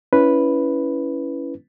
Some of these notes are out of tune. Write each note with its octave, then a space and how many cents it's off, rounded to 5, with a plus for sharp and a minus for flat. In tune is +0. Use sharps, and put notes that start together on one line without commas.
C#4 +15 E4 +0 B4 +0